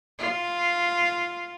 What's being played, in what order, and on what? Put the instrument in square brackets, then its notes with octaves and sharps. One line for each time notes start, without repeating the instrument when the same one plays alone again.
[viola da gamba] F4